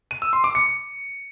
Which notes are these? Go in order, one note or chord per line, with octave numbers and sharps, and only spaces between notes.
D#7
E6
C6
D6
C#7